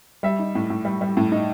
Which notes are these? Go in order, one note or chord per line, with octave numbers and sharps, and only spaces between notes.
G3 E5
D#4
A2
A2
G3
G3
A2
D#4